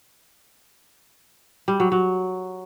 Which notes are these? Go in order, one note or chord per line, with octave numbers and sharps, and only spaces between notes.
G3
F#3
F#3